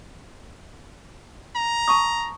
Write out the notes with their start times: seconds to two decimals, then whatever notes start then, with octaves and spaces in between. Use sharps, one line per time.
1.56 A#5
1.88 A5 C#6 D#6